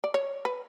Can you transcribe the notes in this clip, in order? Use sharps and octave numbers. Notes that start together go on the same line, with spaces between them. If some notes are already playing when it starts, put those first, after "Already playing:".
D5
C#5
B4